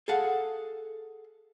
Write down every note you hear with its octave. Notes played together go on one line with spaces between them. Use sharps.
G#4 A4 F5 F#5